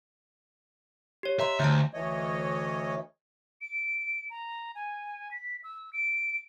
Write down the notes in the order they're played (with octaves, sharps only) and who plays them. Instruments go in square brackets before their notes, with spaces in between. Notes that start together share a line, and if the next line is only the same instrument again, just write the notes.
[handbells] G4 C#5
[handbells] D#5 A#5 C6 [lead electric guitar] E5
[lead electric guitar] D2 [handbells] A5 A#5 G6
[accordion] D2 E3 A3 C#5 D#5
[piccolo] D7
A#5
G#5
B6
E6
D7